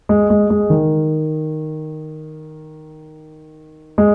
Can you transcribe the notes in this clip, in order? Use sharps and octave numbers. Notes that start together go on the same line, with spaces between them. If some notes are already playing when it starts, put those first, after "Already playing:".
G#3
G#3
G#3
D#3
G#3